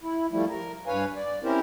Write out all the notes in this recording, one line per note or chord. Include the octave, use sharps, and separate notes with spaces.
E4
F3 G3 A3 E4
A#4
G2 B4 C#5 F5 G#5
D5
C4 C#4 E4 G4 A#4 C5